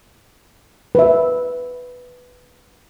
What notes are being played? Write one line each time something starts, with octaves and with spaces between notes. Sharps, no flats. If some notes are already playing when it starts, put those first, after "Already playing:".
B4 E5